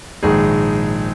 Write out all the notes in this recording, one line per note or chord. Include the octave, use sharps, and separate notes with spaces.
A#1 G#2 D#3 G#4